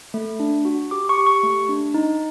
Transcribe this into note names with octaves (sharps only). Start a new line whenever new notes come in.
A3
D4
F#4
G4 D6
C#6
G4
C#6
A3
D4
D#4